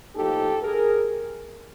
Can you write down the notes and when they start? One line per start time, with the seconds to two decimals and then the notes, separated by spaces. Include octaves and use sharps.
0.14 A2 F3 A#3 D#4 G4 A4
0.62 G#4 A#4